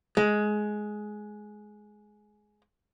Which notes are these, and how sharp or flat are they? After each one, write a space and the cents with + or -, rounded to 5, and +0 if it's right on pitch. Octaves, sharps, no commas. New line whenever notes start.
G#3 +15